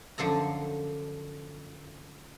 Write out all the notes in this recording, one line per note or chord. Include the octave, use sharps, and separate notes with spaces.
F#2 D3 F3 A4 A#5